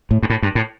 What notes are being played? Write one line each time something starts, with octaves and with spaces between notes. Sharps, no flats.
A2
G2
A2
G2
A2